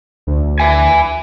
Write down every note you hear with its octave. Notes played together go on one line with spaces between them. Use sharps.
D2
E5 G#5